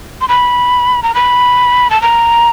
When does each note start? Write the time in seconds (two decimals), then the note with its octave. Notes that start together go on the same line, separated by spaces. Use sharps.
0.21 C6
0.28 B5
1.03 A#5
1.15 B5
1.90 A5
2.02 A#5